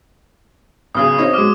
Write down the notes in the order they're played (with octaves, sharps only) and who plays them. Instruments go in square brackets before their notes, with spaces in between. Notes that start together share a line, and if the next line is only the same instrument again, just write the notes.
[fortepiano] B1 C#3 G#4 [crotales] D#6 F6
[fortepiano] C4 C#4 D#4
[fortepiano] F#3 G#3 [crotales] D6 F6